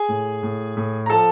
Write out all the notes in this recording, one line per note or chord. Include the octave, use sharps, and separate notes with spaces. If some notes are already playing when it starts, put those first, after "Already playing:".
Already playing: G#4 G#5
A2
A2
A2
A#5
F3 A4 A5